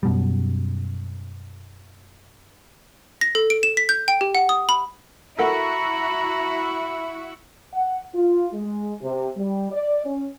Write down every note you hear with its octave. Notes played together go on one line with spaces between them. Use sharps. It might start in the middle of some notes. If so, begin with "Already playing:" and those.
F#2 B2 G3
A#6
A4
D7
E7
B6
G6
G5
G4
F#5
D#6
B5
E4 F#4 A4 A#4 E5 F#5 A#5 B5
F#5
F4
G#3
C3
G3
D5
C#4